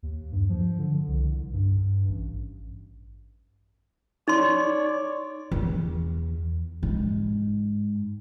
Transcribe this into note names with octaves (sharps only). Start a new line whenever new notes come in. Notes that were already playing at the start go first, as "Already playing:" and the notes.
D#2
G2
F3
D3
C2
G2
A1
D#4 C#5 D5 C6
E2
G#2